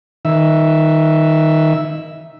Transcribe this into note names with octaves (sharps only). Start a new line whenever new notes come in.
D#3 E5